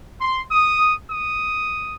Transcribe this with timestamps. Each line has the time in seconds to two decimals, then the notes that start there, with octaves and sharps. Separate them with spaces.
0.20 C6
0.50 D#6
1.10 D#6